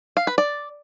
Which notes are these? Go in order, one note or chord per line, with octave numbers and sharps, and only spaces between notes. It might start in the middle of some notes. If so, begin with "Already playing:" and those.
F5
B4
D5